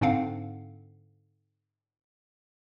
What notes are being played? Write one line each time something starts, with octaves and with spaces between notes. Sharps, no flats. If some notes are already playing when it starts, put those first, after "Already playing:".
G#2 D3 C4 D4 F5 F#5